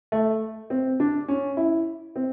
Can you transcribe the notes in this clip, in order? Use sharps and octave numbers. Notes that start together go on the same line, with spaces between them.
A3
C4
D4
C#4
E4
C4